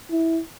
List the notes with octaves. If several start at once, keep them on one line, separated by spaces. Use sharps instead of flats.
E4